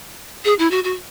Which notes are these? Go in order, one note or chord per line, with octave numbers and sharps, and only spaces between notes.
G#4
E4
F#4
F#4